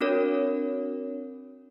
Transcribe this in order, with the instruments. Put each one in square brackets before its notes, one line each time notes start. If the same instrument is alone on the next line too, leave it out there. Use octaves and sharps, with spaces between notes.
[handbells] C4 D4 F#4 A#4 C#5